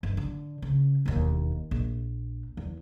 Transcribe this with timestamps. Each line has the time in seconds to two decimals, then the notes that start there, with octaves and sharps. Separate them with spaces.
0.03 G1
0.17 D3
0.62 C#3
1.06 E1 D#2
1.71 A#1
2.57 E2